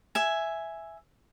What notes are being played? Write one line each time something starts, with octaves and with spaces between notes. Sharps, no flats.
E5 G#5